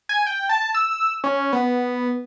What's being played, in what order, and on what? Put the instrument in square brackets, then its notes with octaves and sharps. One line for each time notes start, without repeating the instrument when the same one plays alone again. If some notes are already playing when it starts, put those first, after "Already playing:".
[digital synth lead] G#5
G5
A5
E6
C#4
B3